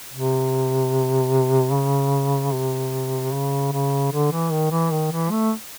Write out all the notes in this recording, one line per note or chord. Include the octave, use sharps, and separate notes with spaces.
C3
C#3
C3
C#3
C#3
D3
E3
D#3
E3
D#3
E3
A3